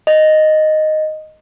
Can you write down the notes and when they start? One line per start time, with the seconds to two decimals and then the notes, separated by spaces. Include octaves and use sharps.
0.07 D#5